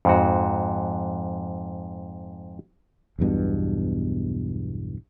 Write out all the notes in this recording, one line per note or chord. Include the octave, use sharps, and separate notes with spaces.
F2 G#2 F#4
B1 E2 G2 B2